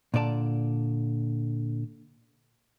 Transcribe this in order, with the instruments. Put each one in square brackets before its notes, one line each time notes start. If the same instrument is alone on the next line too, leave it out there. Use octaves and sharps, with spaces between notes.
[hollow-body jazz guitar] A#2 D3 D5 A5